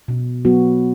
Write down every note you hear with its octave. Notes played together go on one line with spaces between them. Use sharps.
B2
F#3 B3 F#4